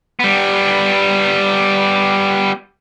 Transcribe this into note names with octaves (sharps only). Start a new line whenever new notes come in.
G3 B3